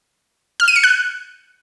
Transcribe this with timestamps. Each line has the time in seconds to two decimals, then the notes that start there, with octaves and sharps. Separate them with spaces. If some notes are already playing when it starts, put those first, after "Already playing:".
0.60 F6
0.68 D#7
0.76 C#7
0.83 F#6